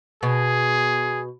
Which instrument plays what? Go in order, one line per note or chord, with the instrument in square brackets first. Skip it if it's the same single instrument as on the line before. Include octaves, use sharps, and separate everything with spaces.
[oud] B2 [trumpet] G#4